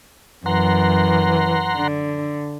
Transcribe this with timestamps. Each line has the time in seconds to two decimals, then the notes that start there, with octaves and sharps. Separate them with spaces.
0.46 F#2 E3 F#5 A#5 C6
1.76 D3